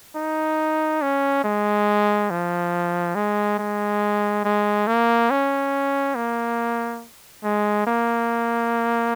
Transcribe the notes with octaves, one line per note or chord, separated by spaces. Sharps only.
D#4
C#4
G#3
F3
G#3
G#3
G#3
A#3
C#4
A#3
G#3
A#3